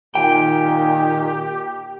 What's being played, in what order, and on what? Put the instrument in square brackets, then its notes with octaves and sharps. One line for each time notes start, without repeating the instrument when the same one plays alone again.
[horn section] A#2 D#3 [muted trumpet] G4 [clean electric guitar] G5